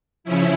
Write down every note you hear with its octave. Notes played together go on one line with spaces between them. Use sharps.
C#3 F3 C#4 E4